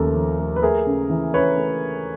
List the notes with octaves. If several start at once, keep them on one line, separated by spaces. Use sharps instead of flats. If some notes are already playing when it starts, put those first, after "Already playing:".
Already playing: D#2 C#3 F3 A3 A4 A#4
F3
A3
B4
A3 G#4 A#4
C#3
E3
C#3 B4 C#5
A3